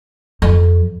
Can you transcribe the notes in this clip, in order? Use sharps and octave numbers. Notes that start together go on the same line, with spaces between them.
F2